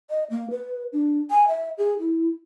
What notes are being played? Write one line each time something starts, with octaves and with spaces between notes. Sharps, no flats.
D#5
A#3
B4
D4
G#5
E5
G#4
E4